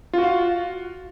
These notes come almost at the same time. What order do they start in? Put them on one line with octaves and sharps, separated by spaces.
F4 F#4 F5